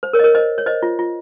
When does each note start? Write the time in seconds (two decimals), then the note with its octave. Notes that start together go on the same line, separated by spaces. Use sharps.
0.03 C5
0.13 A#4 C#5
0.19 D#5
0.24 A#4 C#5
0.35 C5 D#5
0.58 C#5
0.66 C5 D#5
0.83 F4
0.99 F4